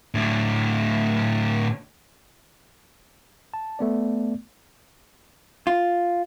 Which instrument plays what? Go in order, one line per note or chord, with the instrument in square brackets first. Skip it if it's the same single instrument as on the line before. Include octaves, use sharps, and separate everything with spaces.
[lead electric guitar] A2 D3
[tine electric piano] A5
A3 B3 D5
[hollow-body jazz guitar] F4